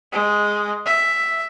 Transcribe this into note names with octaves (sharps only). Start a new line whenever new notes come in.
G#3
E5